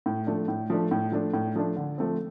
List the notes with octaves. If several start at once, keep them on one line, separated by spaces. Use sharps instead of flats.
A2
F3 A3 D4
A2
F3 A3 D4
A2
F3 A3 D4
A2
F3 A3 D4
D3
F3 A3 C4